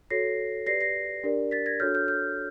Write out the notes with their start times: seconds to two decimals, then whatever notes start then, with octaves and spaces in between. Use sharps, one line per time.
0.10 F#4 A4 C#5 A#6 C7
0.66 G4 B4 D5 A#6 C7
0.81 A#6 C7
1.23 D4 G4 A#4 D5
1.51 A6 B6
1.66 G#6 A#6
1.80 D4 F#4 A4 C#5 F6 G6
1.95 F6 G6
2.08 F6 G6